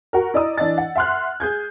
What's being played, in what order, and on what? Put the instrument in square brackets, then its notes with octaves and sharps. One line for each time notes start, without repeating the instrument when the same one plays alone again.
[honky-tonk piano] F#4 A#4
E4 D5 D#5 A#5 D#6 E6
E3 D4 D#5 A6
F#5
E5 F#5 C6 F6 F#6
G#4 G6 G#6